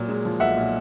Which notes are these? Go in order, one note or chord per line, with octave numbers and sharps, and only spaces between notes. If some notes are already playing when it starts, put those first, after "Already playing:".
Already playing: A#2 F#3
G#3
F3
B1 E5 F#5
A#2